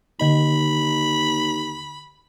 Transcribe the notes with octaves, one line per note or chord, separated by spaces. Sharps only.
D#2 D3 D#5 B5 F#7